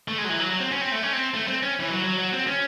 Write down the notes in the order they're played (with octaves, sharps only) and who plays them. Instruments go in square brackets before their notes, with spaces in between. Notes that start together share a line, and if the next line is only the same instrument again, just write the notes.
[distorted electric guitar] A3
G#3
F#3
E3
F#3
F#3
C4
C#4
C4
A3
C#4
C4
A3
C4
C#4
E3
F#3
F#3
F#3
C4
C#4